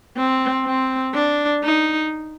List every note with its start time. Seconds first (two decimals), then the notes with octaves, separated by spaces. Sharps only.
0.17 C4
0.66 C4
1.14 D4
1.64 D#4